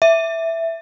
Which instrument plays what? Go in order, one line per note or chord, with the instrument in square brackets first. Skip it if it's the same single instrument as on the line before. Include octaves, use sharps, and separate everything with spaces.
[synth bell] E5